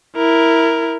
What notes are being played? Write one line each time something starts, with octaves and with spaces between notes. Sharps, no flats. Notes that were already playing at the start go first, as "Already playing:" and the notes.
E4 A#4